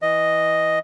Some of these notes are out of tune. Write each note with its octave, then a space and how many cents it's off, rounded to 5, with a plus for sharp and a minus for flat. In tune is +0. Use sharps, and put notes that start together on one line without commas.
E3 -5 D#5 +0